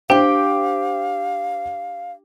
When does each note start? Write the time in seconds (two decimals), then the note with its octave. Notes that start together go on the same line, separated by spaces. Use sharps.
0.10 D4 G4 C5 F5 G5 D6